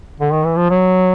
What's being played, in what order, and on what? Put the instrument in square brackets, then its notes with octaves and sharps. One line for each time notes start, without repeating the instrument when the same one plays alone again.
[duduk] D3
D#3
E3
F3
F#3